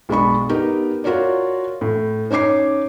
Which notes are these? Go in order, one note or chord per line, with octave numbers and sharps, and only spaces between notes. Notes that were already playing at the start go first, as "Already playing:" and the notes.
B1 G#3 D4 B5 C#6
B3 D#4 G4 A#4
F4 F#4 A#4 C#5 D5
A2
C#4 D#4 C#5 D6 C7